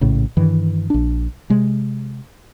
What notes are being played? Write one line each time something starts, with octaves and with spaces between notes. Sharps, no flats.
A#1 A2 C#3
G2 D#3 E3
A#1 D4
C3 G#3